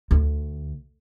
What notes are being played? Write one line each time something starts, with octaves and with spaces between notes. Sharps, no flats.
D2